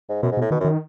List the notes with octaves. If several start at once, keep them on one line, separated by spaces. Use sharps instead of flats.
G#2
F#2 B2
G#2
B2
A2
B2 D#3
F#2
D#3